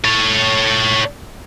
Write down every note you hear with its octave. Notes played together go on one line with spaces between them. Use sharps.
A4 C#5